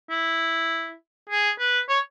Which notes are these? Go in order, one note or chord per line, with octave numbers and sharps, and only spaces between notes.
E4
G#4
B4
C#5